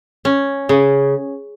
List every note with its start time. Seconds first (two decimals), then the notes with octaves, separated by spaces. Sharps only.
0.25 C#4
0.69 C#3